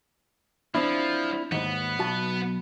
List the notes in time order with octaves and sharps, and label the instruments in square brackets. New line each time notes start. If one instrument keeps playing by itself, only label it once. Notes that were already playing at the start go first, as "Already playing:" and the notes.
[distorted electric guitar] F3 [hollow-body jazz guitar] C4 D4 E4
[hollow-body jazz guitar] D#2 G#2 [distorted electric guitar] B3
[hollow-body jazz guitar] B1 F#4 A5